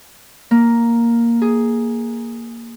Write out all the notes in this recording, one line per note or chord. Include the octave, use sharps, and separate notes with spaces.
A#3
G#4